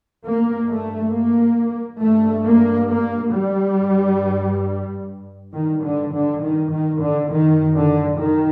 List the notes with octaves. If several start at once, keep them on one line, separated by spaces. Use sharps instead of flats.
G2 A#3
A3
A#3
G2 A3
A#3
A#3
G3
G2
G2 D#3
D3
D3
D#3
D#3
D3
F#2 D#3
D3
D#3